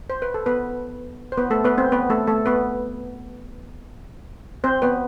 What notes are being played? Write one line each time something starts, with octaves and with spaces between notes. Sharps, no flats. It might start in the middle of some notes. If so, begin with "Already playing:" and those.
C5
B4
A4
B3 B4
C5
B3 B4
A3 A4
B3 B4
C4 C5
B3 B4
A3 A4
A3 A4
B3 B4
C4 C5
B3 B4